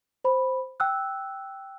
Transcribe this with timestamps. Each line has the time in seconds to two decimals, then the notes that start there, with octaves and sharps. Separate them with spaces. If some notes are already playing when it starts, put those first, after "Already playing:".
0.24 C5 B5
0.80 G5 E6 F#6